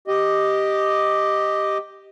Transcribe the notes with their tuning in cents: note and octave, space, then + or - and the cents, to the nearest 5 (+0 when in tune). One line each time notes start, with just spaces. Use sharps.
G4 +0 D#5 +0